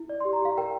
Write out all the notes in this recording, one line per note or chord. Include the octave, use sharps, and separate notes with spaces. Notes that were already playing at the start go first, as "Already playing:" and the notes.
Already playing: E4
D5
G4 C6
A#5
G4 F5
A#4 G5